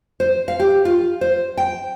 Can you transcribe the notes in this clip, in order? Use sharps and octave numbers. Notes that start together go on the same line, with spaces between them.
C5
F5
G4
F4
C5
G5